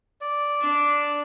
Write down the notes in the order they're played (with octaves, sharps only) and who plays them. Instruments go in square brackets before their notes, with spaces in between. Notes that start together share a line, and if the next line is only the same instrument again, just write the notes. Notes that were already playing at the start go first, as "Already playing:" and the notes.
[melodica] D5
[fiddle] D4